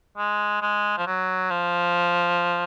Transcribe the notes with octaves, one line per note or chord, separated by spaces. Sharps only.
G#3
G#3
F3
F#3
F3